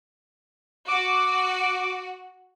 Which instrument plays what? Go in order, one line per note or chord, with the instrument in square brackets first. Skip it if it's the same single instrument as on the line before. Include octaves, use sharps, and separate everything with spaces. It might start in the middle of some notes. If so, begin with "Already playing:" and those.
[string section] F#4 [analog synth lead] D6